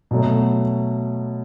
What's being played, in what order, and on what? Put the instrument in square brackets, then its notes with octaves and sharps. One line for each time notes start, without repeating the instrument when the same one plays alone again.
[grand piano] B2 F#3 A3